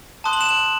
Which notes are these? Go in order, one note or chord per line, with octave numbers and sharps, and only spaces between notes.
A5 C6 D#6 F#6
F#7
E7
F#7